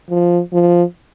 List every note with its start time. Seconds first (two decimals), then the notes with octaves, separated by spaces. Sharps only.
0.10 F3
0.53 F3